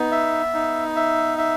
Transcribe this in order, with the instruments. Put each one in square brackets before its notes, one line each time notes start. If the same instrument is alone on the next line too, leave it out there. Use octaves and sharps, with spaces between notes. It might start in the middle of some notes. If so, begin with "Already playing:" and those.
Already playing: [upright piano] B3 [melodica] D#4
[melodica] E5
D#4
E5
E5